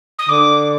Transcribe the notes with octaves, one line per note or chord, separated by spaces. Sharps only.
D#6
D3 D6